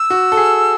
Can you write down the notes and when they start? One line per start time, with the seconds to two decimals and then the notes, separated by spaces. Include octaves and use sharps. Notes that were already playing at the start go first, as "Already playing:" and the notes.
Already playing: E6
0.10 F#4
0.32 A4
0.37 G#4